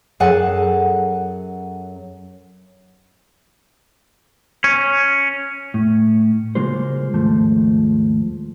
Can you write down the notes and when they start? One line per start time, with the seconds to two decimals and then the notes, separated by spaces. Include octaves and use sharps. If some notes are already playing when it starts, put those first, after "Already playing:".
0.20 F#2 G#4 A4 F#5 G#5
4.64 C#4
5.74 A2
6.55 C#3 F#3 G#3 A#3 F4 C5
7.14 D#2 G#2 F3 A3